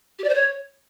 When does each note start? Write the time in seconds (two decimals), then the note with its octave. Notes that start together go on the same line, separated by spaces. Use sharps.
0.18 G4
0.24 D5
0.29 C5
0.34 C#5